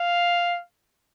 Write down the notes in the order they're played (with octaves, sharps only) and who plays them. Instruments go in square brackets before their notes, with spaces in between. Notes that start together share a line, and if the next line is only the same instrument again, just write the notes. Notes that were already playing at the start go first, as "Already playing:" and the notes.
Already playing: [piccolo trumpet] F5